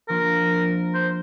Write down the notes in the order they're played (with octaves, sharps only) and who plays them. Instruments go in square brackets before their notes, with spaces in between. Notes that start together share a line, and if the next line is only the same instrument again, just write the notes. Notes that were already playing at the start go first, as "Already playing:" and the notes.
[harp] F3 A#3 D4 F4 [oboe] A#4
[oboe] C5